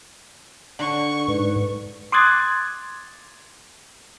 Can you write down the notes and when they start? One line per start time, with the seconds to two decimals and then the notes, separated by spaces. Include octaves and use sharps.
0.79 D3 C#6
1.28 G#2 B4
2.12 C6 D6 D#6 F#6 G#6 A6